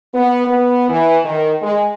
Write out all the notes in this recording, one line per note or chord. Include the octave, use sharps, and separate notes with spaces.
B3
B3
E3
D#3
G#3